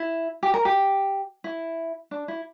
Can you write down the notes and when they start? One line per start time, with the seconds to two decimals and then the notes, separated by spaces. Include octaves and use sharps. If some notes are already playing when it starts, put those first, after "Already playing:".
Already playing: E4
0.43 G4
0.54 A#4
0.65 G4
1.44 E4
2.11 D4
2.28 E4